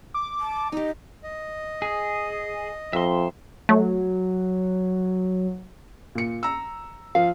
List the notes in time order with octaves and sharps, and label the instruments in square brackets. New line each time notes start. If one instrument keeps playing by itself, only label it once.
[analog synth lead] D6
[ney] A5
[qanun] D#4 G4 [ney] D#5
[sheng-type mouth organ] D#5
[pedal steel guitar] G#4
[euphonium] F2 [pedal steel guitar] E5 C6
[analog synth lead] F#3 [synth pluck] A3
[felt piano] A#2 C#7
A#5 E6
[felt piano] F3 [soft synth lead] F5